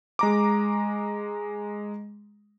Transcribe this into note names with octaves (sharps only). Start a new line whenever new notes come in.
G#3 A#5 D6